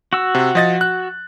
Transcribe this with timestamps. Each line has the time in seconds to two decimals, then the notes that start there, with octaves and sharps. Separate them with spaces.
0.13 F#4 E6
0.35 C3
0.55 F3 D#5 A6
0.81 F#6